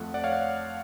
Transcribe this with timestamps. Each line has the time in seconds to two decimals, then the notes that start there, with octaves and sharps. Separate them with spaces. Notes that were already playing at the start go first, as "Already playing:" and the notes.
Already playing: F2 F3 A3 F#5
0.14 D5 F#5
0.24 C#5 F5
0.32 D5 F#5